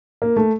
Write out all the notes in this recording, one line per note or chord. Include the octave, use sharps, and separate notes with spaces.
A#3
A3